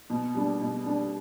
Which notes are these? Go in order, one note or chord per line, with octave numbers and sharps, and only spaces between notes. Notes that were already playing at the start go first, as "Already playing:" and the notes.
B2
G3 D4
B2
G3 D4